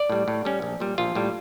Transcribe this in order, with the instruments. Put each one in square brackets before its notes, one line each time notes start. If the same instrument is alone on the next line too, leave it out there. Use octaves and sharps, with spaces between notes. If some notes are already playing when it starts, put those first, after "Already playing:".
Already playing: [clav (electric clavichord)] D5
A2 G3
A2
G3 C#4
A#1
A#2 G3
A#1 F4
A2 G3